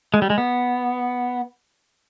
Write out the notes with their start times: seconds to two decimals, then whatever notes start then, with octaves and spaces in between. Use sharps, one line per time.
0.14 G#3
0.22 G3
0.30 G#3
0.38 B3